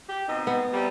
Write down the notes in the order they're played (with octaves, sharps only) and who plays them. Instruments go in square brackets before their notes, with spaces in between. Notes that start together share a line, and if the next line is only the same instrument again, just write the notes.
[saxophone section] G4
B2 C4 D#4
[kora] B3
[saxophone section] C3 G3